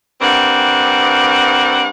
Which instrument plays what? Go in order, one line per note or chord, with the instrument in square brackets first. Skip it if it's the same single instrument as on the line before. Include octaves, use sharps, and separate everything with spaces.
[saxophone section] G2 A#3 C4 F#5